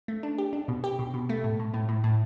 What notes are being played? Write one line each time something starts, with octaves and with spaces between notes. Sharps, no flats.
A3
D4
G4
D4
B2
G4
B2
B2
A3
A2
A2
A2
A2
A2